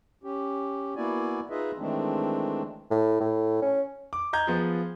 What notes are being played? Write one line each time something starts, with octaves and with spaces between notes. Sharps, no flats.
C#4 G4
A#3 B3 E4 F#4 D5 G#5
D#4 F4 G#4 B4 D#5 E5
D#3 E3 G#3 A3 C4 D4
A2
A2
C#4
D6
D#5 A#5 G6 G#6
F3 B3 F4 G#4